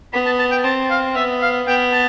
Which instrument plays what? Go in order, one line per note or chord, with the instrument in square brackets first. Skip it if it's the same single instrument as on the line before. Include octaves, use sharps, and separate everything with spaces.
[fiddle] B3 [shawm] B5
[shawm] A5
A5
G5
[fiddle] C4 [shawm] A5
[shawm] F5
[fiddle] B3 [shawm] E5
[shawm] F5
[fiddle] B3 [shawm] G5
[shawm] A5